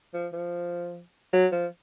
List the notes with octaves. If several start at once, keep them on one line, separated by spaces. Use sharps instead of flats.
F3
F3
F#3
F3